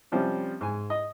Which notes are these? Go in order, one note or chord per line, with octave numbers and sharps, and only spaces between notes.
C3 F3 G3 C#4
G#2 G#5
D#5